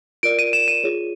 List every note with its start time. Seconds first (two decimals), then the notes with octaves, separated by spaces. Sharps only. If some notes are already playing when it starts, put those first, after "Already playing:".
0.23 F4 A#4 D5 D7
0.39 D#7
0.53 E7
0.68 D#7
0.84 F4 G#4 C#5